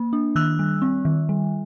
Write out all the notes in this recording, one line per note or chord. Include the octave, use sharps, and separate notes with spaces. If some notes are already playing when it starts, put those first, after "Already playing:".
Already playing: A#3
D4
D#3 E6 F#6
G3
C4
D#3
G3